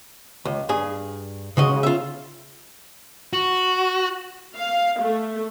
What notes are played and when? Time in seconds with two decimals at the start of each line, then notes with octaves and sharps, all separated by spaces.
0.45 C#2
0.69 G2 G#4
1.57 C#3 G#3 F#4 D#5
1.83 F4 E5
3.33 F#4
4.57 F5
5.01 A3